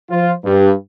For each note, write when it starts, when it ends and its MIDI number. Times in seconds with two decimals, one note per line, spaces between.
0.11 0.33 53
0.11 0.33 65
0.11 0.33 72
0.44 0.72 43